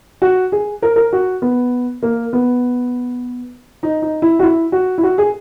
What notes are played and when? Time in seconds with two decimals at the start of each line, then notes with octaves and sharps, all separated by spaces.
0.22 F#4
0.52 G#4
0.82 A#4
0.96 A#4
1.13 F#4
1.42 B3
2.03 A#3
2.33 B3
3.83 D#4
4.02 D#4
4.22 E4
4.39 F#4
4.42 E4
4.72 F#4
4.98 E4
5.03 F#4
5.18 G#4